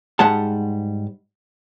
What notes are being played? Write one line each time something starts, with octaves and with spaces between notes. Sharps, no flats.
G#2 G3 G#3 F#5 A5